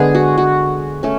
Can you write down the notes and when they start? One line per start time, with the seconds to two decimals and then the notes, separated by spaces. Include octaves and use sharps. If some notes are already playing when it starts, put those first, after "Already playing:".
Already playing: D3 G#3 B3 G#4
0.15 F#4
0.38 F#4
1.03 A3 C#4